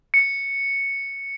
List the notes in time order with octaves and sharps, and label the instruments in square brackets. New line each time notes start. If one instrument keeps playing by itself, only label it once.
[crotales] C#7